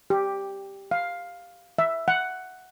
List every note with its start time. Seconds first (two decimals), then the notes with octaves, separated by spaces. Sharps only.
0.10 G4
0.91 F5
1.78 E5
2.08 F#5